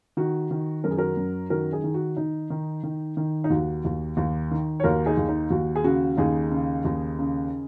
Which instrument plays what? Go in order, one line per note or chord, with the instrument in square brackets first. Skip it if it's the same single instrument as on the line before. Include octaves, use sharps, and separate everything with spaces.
[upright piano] D#3 F#4
D#3
F#2 A#4
G#4
F#4 A#4
F#2
D#3 F#4 A#4
D#4 G#4
D#3
F#4
D#3 D#4
D#3
D#3
D#3
D#4
D#2 F#4
D#2
D#2
D#3
C#5
D#2 F#4 A#4
D#4 G#4
D#2
D#4
D#2 F#4
G#4
C#3 F#4
D#2 D#4 G#4
C#3
D#2
C#3